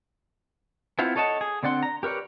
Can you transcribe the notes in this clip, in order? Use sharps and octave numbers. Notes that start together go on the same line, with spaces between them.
B3 C4 E4 F4 F5
A4 C#5 D#5 F#5 A5
G#4
D3 C4 D5 F#5 C6
A#5
G4 A#4 B4 C#5 D5